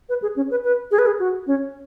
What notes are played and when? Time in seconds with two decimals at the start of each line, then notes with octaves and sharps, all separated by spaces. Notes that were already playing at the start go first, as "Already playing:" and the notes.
0.09 B4
0.22 G#4
0.36 C#4
0.51 B4
0.64 B4
0.91 G#4
0.99 B4
1.06 G#4
1.19 F#4
1.47 C#4